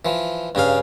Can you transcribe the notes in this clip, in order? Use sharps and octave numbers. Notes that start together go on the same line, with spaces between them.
E3 F3
G2 C#3 G#4 F5